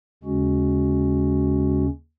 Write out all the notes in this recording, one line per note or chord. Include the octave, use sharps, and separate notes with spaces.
D#2 C#3 G#3 C#4 F#4